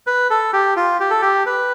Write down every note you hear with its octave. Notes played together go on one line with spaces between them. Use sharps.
B4
A4
G4
F4
G4
A4
G4
B4